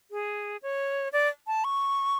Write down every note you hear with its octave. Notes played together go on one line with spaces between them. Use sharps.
G#4
C#5
D5
A5
C#6